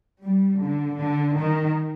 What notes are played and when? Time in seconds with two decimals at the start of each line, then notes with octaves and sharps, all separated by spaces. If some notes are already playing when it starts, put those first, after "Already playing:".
0.23 G3
0.61 D3
0.98 D3
1.35 D#3